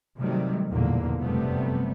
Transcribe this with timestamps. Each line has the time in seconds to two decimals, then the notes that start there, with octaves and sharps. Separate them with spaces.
0.18 C3 D#3 F#3 G3 A3
0.70 A#1 E2 G#2 B2 D3 A#3
1.21 F1 F#2 C3 G3 A3 B3